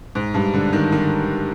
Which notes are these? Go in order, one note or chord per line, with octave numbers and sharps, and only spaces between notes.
G#2
G2
D3
D#3
D#3